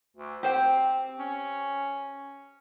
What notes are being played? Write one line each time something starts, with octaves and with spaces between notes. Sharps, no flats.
D2
C4 G4 C5 G5
C#4